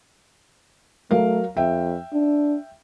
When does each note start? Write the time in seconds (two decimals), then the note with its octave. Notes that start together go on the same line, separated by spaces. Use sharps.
1.11 F#3 A3 A#4 F5
1.57 F2 E5 G5
2.13 D4